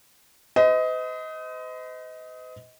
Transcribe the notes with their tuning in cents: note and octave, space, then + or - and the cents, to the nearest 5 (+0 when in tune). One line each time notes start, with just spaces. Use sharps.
C5 -45 D#5 +20